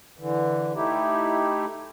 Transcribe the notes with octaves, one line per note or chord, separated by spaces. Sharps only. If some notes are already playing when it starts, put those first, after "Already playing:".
D3 E3
A3 D#4 E4 G4